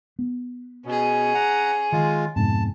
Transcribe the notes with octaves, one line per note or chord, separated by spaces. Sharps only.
B3
B2 C#4 G#4
F#5 A#5
D#3 G#3 F4
F2 G#2 B2 A5